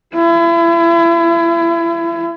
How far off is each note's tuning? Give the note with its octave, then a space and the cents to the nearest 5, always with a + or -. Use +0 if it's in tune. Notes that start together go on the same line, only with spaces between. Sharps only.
E4 +35